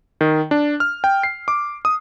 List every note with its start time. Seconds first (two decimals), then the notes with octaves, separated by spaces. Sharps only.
0.21 D#3
0.51 D4
0.80 F6
1.04 G5
1.23 C7
1.48 D6
1.85 D#6